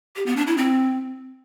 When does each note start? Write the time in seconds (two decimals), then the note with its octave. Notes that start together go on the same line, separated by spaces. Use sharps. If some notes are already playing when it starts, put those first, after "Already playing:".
0.16 G4
0.26 B3
0.37 D4
0.47 E4
0.58 C4